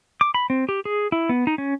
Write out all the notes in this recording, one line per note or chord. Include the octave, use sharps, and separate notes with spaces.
D6
B5
C4
G4
G#4
E4
B3
D#4
C#4